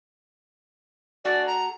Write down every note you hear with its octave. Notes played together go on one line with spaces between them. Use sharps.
A3 F#4 G#4 D5
A#5